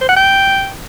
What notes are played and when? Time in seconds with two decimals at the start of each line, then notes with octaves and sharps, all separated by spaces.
0.01 C5
0.09 F#5
0.16 G5